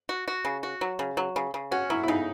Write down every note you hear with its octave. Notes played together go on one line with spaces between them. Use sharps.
F#4
F#4
C#3
F#4
F#3
C#3
F#3
C#3
C#3
C#4 F#4
F#3 E4
E4
C#3 D#4